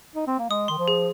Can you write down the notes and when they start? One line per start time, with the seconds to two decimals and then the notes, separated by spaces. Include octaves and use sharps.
0.15 D#4
0.27 C4
0.39 A#3
0.50 G#3 D#6
0.68 D#3 C6
0.78 F3
0.88 G#4